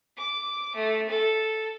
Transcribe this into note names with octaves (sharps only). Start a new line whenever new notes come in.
D6
A3
A4